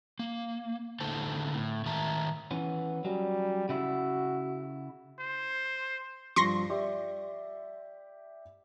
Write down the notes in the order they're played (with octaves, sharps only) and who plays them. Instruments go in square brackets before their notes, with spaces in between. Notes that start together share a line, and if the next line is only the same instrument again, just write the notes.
[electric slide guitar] A#3
A2 D3 D#4 A4 C5 A5
A2
A2 D#3 E5 A5 A#5
[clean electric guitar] E3 B3 C#4
[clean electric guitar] F#3 C#4 [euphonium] G3
[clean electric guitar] C#3 E4 [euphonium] F#4
[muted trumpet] C5
[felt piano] G2 F3 [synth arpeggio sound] C6 C#6 A#6
[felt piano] G4 D5 E5